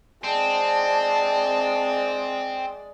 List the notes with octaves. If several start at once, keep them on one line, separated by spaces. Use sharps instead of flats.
G#3 C4 D5 A5